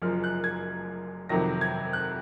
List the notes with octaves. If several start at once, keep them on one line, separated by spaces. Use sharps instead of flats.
F#1 F#2 F3 F6
F#6
G#6
F2 C3 D#3 F#3 A#6
G#6
F#6